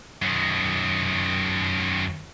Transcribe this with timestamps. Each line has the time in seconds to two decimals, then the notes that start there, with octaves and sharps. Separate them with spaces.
0.22 F#2 D#3